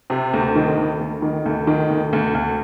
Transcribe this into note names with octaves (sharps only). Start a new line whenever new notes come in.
C3
D2
D#3
D2
D2
D#3
D2
D#3
D2
D2
D2